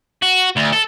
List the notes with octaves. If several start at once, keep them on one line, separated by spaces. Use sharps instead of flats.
F#4
D2
A4